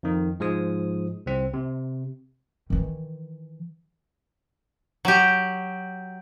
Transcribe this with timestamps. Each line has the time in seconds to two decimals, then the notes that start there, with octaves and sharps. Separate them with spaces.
0.03 F2 D#3
0.40 G#2 F3 G#3 D#6
1.26 C2 C4
1.54 C3
2.70 D#3 E3
5.05 F#3 G4